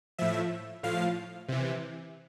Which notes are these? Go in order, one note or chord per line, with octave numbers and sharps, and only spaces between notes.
A2 F3 E5
A2 F3 F5
C3 E3